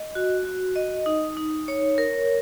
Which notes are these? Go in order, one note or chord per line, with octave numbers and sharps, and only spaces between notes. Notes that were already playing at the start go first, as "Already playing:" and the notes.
Already playing: D#5
F#4
F#4
D#5
D#4
D#4
C#5
A#4